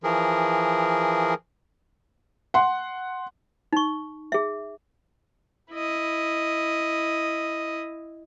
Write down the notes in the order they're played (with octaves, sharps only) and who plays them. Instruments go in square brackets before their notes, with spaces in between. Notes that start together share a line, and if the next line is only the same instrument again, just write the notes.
[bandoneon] E3 F3 G#4 A#4
[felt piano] F#5 C6
[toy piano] D#4 C#6
G#4 E5
[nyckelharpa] E4 D#5